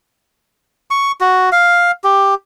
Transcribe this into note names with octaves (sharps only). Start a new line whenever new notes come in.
C#6
F#4
F5
G4